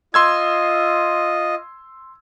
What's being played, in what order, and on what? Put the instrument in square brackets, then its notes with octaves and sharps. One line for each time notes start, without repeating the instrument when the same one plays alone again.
[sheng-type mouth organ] F4 D#5 [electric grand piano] C6 E6 G#6